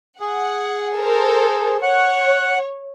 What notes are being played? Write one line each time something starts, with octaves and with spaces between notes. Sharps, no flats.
G#4 F#5
A4 A#4 C5
C#5 F#5